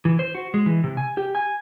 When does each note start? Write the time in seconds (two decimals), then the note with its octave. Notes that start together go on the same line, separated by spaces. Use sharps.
0.05 E3
0.19 C5
0.35 F#4
0.54 G#3
0.66 E3
0.84 C3
0.97 G#5
1.17 G4
1.35 G#5